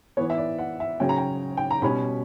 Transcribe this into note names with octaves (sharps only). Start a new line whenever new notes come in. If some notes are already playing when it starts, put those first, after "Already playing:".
E3 B3 C#5
E5
D5
F#5
E5
C#3 F#3 C#4 G5
A#5
G5
G5
A#5
B2 G3 C#4 B5